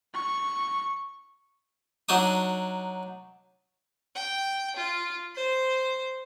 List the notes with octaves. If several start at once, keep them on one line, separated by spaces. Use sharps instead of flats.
C#6
F#3 D4 D#4 D#6
G5
F4
C5